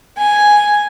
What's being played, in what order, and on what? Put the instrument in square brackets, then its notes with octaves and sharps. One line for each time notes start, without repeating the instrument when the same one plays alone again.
[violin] G#5